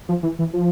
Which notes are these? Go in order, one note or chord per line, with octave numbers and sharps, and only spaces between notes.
F3
E3
E3
F3